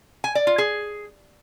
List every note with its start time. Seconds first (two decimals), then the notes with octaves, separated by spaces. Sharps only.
0.24 G#5
0.35 D5
0.47 F4
0.58 G#4